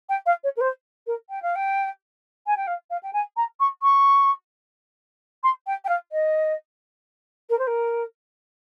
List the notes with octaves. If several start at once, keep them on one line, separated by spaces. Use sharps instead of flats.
G5
F5
C#5
A#4
C5
A#4
G5
F5
G5
G#5
G5
F5
F5
G5
G#5
A#5
C#6
C#6
C6
G5
G5
F5
D#5
A#4
C5
A#4